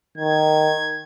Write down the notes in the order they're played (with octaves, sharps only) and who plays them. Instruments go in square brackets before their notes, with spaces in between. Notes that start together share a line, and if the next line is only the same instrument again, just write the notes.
[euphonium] D#3 [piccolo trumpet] G#6